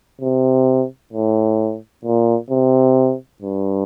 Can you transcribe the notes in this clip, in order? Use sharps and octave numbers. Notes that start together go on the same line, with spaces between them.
C3
A2
A#2
C3
G2